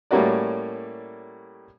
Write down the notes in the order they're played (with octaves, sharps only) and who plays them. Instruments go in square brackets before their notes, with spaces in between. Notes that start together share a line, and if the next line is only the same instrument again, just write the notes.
[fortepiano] A2 G3 A#3 C#4 F#4 D5